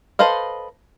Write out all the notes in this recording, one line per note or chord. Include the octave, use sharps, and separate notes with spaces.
A4 B4 C5 D#5 F5